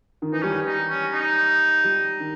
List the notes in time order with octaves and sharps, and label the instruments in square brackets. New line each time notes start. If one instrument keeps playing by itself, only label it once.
[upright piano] D#3
[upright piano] E3 [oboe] D#4
[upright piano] G3 [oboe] C#4
[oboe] D#4
C#4
D#4
[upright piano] G3
D#3